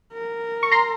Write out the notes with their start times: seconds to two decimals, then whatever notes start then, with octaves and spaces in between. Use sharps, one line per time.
0.14 A#4
0.63 C#6
0.71 A#5 C6